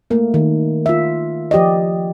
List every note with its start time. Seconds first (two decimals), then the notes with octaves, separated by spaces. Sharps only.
0.10 A3 A#3
0.34 D#3
0.86 F4 E5
1.51 F3 G4 D5 D#5